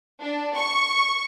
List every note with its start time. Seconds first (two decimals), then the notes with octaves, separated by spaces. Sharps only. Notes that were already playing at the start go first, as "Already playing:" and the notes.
0.20 D4
0.57 C#6